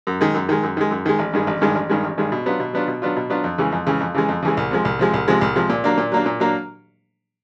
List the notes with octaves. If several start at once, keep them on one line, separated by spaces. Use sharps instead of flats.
F#2
D#3 G#3
F#2
D#3 G#3
F#2
D#3 G#3
F#2
D#3 G#3
A1
G2 D#3 G#3
A1
G2 D#3 G#3
A1
G2 D#3 G#3
A1
G2 D#3 G#3
B2
F#3 B3 D4 F4
B2
F#3 B3 D4 F4
B2
F#3 B3 D4 F4
B2
F#3 B3 D4 F4
F2
C#3 E3 G#3
F2
C#3 E3 G#3
F2
C#3 E3 G#3
F2
C#3 E3 G#3
C2
C3 F3 G#3
C2
C3 F3 G#3
C2
C3 F3 G#3
C2
C3 F3 G#3
A#2
F#3 A#3 D4
A#2
F#3 A#3 D4
A#2
F#3 A#3 D4